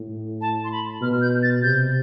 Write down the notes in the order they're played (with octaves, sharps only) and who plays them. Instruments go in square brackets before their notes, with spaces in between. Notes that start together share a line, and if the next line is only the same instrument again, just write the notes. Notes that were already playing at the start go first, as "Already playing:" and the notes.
Already playing: [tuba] A2
[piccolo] A5
C6
B5
[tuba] B2 [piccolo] F6
[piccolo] G6
A6
[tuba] C3 [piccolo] G6